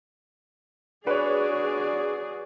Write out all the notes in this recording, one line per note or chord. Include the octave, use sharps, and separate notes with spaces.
D4 F#4 G#4 B4 C#5 D5